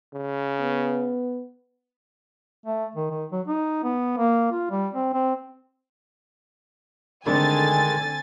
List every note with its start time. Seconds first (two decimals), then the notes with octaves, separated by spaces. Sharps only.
0.14 C#3
0.60 B3
2.66 A3
2.95 D#3
3.11 D#3
3.32 F#3
3.47 D#4
3.84 B3
4.17 A#3
4.51 F4
4.70 G3
4.94 C4
5.13 C4
7.26 D3 D#3 G#3 A3 C4 D4 G#5 A6